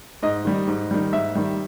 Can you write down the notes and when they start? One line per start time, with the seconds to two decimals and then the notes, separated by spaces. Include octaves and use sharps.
0.23 G#2 D#5
0.45 D#3 G3
0.67 G#2
0.91 D#3 G3
1.13 G#2 E5
1.35 D#3 G3